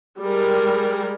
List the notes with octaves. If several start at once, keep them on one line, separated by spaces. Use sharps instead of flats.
G3 G#3 A#4